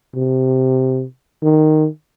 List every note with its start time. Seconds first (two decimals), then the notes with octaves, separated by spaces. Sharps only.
0.15 C3
1.42 D#3